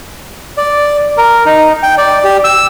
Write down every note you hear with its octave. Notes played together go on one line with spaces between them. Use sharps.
D5
A#4
D#4
G5
D5
G4
E6